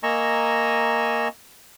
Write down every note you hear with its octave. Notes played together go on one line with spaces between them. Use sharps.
A#3 D#5 G#5 A#5 C#6 E6